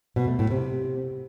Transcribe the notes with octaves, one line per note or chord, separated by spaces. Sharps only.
B2
A3
A2
C3